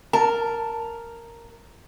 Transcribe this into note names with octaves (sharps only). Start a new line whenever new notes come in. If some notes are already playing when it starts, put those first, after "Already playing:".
A#4 A5